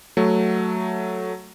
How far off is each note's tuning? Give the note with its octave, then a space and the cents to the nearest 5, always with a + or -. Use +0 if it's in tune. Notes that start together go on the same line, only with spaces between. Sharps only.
F#3 +0 A3 +0